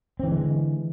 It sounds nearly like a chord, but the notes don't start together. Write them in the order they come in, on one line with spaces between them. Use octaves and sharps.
C4 E3 D3 G#3